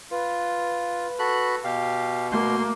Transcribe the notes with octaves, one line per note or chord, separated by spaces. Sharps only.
F4 B4
F#4 A4 B5 F#6
B2 G4 F5
A3 A#3 F#4 C6